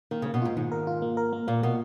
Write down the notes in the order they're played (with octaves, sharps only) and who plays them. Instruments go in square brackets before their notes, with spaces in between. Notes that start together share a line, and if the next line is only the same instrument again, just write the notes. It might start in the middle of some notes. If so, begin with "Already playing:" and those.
[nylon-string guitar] D#3 [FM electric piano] A#3
[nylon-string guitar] C#3 [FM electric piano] A#3
[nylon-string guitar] B2
[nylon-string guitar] G#2 [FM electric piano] F4
[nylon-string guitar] G#2 [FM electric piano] D#3
[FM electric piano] A#4
F4
A#3
A#4
A#3
[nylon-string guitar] A#2 [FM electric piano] A#3
[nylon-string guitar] B2 [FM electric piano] A#3